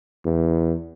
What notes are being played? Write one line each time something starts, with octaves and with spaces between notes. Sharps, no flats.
E2